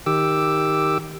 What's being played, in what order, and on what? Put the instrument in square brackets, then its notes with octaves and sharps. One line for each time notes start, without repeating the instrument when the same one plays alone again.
[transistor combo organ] D#3 G4 D6 E6